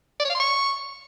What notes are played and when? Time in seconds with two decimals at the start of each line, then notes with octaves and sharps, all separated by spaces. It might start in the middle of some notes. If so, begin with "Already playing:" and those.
0.20 D5
0.25 C#5
0.30 F5
0.35 C6
0.40 C#6